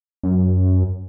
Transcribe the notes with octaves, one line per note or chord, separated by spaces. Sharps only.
F#2